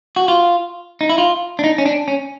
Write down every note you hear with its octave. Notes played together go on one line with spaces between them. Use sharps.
F#4
F4
D#4
E4
F4
D4
D#4
C#4
D4
C#4